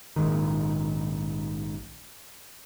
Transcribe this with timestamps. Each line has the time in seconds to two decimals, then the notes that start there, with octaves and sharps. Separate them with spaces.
0.16 A#1 G#2 D#3